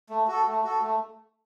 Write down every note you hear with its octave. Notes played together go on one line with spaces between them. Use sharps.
A3
F#4 A4
A3
F#4 A4
A3